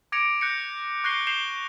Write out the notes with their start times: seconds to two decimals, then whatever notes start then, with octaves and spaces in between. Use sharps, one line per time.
0.12 D6 G#6 A#6 C#7 D7 F7
0.41 F#6 G6 A#6 C#7
1.04 C#6 F#6 G6 A#6 C7 G7
1.27 G6 C7 E7 F7 G7